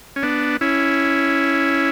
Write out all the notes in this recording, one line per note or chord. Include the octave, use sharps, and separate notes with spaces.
C#4
B3 D4
C#4 E4